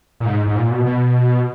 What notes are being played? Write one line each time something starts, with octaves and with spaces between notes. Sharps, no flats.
A#2
G#2
G#2
A#2
B2
B2